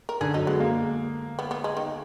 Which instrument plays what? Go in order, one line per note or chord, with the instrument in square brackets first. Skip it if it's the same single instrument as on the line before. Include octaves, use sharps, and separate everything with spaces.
[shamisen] A#4
[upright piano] D3 [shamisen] G#4
[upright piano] F#3 [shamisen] D#4
[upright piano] G#3 [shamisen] B3
[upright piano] A#3
[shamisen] B3
B3
G#3
D#3